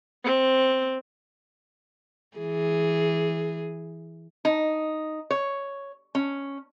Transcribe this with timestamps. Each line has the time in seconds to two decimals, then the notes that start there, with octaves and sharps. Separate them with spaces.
0.24 C4
2.37 E3 G#4
4.45 D#4
5.31 C#5
6.15 C#4